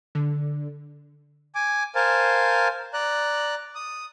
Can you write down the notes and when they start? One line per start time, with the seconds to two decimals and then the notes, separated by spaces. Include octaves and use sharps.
0.15 D3
1.55 G#5 D6
1.95 A#4 C5 F5 G#5 A5
2.94 D5 A#5 F#6
3.75 D#6